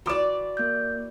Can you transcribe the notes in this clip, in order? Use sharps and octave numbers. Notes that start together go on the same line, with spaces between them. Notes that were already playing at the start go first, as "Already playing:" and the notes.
E3 F#4 D5 D6 E7
A#3 G6